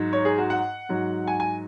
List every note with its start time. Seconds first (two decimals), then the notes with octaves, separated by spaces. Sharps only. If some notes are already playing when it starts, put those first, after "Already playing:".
Already playing: G#2 F#3
0.13 C#5
0.25 G#4
0.38 F#4
0.50 F#5
0.89 G#2 F#3
1.27 G#5
1.40 G#5